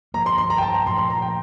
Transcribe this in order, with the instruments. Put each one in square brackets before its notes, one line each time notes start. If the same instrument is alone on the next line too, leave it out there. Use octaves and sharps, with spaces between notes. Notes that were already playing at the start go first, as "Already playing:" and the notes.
[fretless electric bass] G2 F3 A#3 [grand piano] A#5
[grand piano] C6
C6
A#5
G5
A5
A#5
[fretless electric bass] A#2 F3 A3 [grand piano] C6
[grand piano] C6
A#5
G5